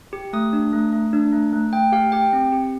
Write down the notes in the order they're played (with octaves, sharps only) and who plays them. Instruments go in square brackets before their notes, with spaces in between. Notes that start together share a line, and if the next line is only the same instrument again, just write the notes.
[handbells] G4
A3 D#6
D4
A3
A3
D4
A3
A3
A3 G5
G4 F5
G4 G5
C4
G4